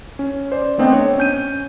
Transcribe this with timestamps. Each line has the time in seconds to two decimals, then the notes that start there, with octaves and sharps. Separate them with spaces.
0.19 C#4
0.52 C5 D5
0.78 A3 B3 C4 D4 D#5 G5
0.93 C#5
1.18 C#4 G6 D#7